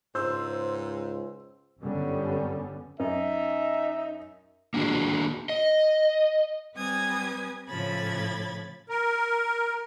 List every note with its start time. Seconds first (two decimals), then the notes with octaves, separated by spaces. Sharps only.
0.15 C#2 G#2 C5 E6
1.81 G1 F#2 D3 G3 B3 C#4
3.00 F#2 D#4 E5
4.74 A#3 D4 F#4 G#4
5.49 D#5
6.76 G3 C4 B4 G#5 D#6 G#6
7.69 A2 C#3 F3 B5 G#6 A6
8.89 A#4